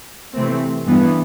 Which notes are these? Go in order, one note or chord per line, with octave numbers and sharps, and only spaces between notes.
C3 E3 A3 C4
G2 E3 B3